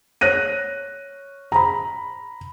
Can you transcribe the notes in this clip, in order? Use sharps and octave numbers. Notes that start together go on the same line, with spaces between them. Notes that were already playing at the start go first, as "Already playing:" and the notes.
C#5 F#6 A#6 D#7
A#5 B5